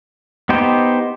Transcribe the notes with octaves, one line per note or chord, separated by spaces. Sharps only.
B3 D#4 G4 C5